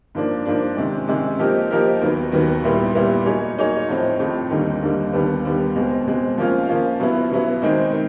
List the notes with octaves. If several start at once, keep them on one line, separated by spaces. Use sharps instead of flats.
G#2 F3 A#3 D4
G#2 F3 A#3 D4
C3 D#3 G#3 C#4
C3 D#3 G#3 C#4
F3 A#3 D#4 G4 A#4
F3 A#3 D#4 G4 A#4
D#2 D#3 F#3 B3
D#2 D#3 F#3 B3
A#2 G3 B3 E4
A#2 G3 B3 E4
F#3 A#3 D#4 G#4 C#5
F#3 A#3 D#4 G#4 C#5
A2 F3 A3 C4
A2 F3 A3 C4
D#2 D3 G3 A#3 D#4
D#2 D3 G3 A#3 D#4
D#2 D3 G3 B3
D#2 D3 G3 B3
B2 G#3 C4
B2 G#3 C4
F3 A#3 C#4 F4
F3 A#3 C#4 F4
B2 F#3 B3 E4
B2 F#3 B3 E4
D#3 G#3 C4 D#4
D#3